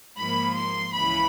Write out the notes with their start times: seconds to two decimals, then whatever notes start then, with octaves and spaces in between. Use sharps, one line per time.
0.17 G#2 F3 A#3 B5
0.55 C6
0.94 C#2 C#3 E3 B5